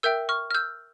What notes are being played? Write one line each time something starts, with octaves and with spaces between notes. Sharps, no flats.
A#4 E5 G5 E6 G6
C#6 F6
F6
E6 G6